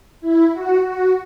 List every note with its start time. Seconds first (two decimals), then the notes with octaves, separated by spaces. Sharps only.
0.21 E4
0.54 F#4
0.86 F#4